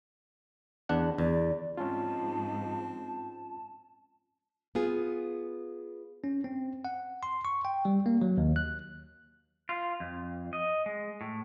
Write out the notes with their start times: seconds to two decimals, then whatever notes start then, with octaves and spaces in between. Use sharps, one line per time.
0.89 E2 D4 F#5
1.18 E2 D5
1.77 G#2 F3 C4 C#4 F4 A5
4.75 B3 F4 G#4
6.24 C#4
6.44 C4
6.85 F#5
7.23 C6
7.45 C#6
7.65 G5
7.85 G3
8.06 A#3
8.22 F#3
8.37 D#2
8.56 F#6
9.69 F4
10.00 F2
10.53 D#5
10.86 G#3
11.21 A2